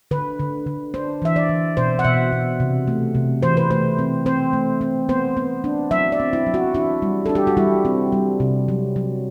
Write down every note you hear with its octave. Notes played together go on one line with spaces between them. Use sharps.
D3 B4
D3
D3
D4 C5
E3 E5
D5
E3
B2 C5
F#5
B2 E5
B2
C3
A3
C3
E3 C5
B4
A3 C5
C4
C4 C5
A3
C4
B3 C5
B3
D4
F#3 E5
D5
C4
E4
F#3
F#4
D4 E4
G3
D4 A4
G4
F#4
G3 E4
C4
G3
C3
F#3
F#3